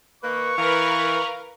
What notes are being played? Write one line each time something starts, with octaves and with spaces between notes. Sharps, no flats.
D#3 A#3 B4 C#6
E3 A#4 B4 F5